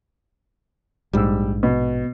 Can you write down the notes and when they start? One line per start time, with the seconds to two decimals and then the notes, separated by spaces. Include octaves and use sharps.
1.13 A#1 G#2 G3 E6
1.63 B2